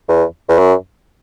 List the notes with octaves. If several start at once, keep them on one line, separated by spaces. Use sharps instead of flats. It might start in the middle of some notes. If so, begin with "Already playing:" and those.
E2
E2
F#2